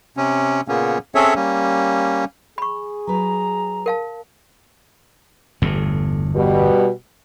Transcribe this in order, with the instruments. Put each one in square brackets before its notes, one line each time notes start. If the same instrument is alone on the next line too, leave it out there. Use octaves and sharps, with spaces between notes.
[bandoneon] C3 C#4
A#2 C#3 A#3 B3 C#4
C4 C#4 G#4 A4 C#5 E5
G3 A#3 C#4
[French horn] G#4 [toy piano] B5 C#6
[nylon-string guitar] F#3 B4 [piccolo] A#5
[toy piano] A#4 F5 A5
[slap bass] G1 E2 A2
[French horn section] B2 G3